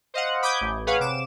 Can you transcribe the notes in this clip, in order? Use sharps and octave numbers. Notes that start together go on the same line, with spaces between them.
C5 D#5 F5 F#5
B5 D6 D#6 G6 G#6
A1
G#4 B4 C#5 F5 F#5
C3 D6 E7